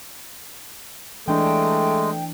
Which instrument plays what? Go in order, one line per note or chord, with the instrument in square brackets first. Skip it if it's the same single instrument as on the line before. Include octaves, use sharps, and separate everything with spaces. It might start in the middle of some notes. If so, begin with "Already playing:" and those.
[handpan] E3 D4 [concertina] G#3 [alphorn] A3 [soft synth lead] G5